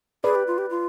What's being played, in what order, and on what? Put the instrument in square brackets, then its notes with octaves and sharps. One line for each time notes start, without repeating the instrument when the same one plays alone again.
[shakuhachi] G#4 [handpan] B4 D5
[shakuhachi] G4
F4
G4
F4